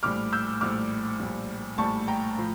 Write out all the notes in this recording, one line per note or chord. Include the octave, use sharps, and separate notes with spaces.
A#1 A2 G3 D6 F6
E6 G6
A#1 A2 G3 D6 F6
A#1 A2 G3
A#1 A2 G3 A5 C#6
G5 A#5
A2 F3